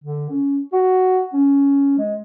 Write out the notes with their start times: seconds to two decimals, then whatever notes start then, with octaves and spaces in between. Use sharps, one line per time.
0.04 D3
0.30 C#4
0.73 F#4
1.33 C#4
1.98 G#3